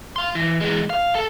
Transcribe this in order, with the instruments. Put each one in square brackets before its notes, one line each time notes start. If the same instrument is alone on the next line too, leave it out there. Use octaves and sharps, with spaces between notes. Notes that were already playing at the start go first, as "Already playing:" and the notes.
[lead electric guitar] F5 C6
E3
E3 G#3
F5
A4